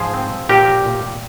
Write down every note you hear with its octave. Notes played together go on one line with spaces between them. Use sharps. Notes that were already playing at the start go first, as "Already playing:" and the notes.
Already playing: G#2 F3 G#4 C5
C4
A#2 G4 A#4
A#2